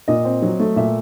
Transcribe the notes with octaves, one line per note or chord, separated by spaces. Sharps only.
A#2 D#5
C4
F#3
A3
A#2 E5